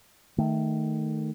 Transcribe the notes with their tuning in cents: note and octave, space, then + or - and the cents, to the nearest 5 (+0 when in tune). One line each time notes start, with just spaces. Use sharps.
D#3 +0 A3 +0